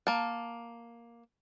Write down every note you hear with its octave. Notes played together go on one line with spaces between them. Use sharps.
A#3 A5